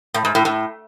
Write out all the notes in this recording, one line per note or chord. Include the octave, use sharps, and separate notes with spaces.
A2
G#2
A2
A2